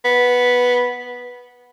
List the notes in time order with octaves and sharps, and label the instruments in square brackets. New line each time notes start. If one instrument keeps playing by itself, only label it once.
[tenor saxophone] B3